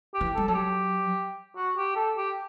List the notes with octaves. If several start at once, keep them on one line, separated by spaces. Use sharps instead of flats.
G4
E3
G3 A4
F#3 A4
G4
F#4
G4
A4
G4